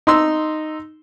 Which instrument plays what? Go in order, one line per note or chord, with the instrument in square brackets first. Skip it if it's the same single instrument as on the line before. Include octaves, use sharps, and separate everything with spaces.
[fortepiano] D#4 C6 E6